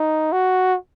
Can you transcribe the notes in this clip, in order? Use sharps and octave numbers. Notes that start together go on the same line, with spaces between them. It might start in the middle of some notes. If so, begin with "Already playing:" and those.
Already playing: D#4
F#4